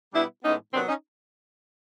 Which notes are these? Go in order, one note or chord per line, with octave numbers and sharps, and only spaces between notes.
B2 G3 B3 D4 E4
A2 E3 G#3 B3 C#4 D#4
C3 D#3 F#3 B3 C4 D4
C#4 D#4